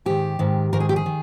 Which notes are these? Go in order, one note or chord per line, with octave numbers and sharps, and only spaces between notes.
G#2 D#3 G4
G#2 D#3
G#2 D#3 A#4
G#4
G4
G#4
D#3